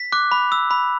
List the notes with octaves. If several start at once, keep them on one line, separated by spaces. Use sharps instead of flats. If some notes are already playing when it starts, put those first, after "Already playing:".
Already playing: B6
D6 F#6
B5
E6
B5